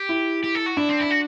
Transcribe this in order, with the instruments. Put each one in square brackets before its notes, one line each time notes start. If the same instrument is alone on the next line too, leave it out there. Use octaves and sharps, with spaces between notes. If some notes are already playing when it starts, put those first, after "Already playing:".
Already playing: [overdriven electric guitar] G4
[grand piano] E4
[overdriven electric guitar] G4
A4
F#4
[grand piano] D4 [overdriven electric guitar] E4
[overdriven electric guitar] C4
E4
F#4